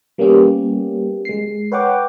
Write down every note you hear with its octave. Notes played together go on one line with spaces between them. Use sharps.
G3 A#3 B3 C#4 G4
G#3 C7
B4 C#5 F#5 G5 D6